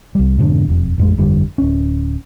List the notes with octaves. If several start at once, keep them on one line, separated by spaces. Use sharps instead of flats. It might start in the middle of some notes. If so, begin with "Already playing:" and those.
C2 G3
F2 G#2 B2 D3
E1 F2
A1 F2 G#3
G1 F2 D3 G3
D1 C#4